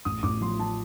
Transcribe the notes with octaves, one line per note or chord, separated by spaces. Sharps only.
A1 D#6
A1 D6
F3 C6
F3 A5